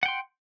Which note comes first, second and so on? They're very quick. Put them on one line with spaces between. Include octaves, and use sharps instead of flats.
F#5 G5 C6